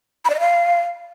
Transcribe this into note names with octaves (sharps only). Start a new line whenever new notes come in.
B5
D5
D#5
F5